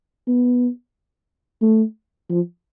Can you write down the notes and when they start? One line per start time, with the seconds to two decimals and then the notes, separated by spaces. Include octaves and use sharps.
0.27 B3
1.62 A3
2.30 F3